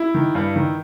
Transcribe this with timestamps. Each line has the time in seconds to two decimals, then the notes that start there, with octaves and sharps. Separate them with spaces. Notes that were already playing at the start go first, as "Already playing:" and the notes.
Already playing: E4
0.14 D#3
0.35 G2
0.56 D#3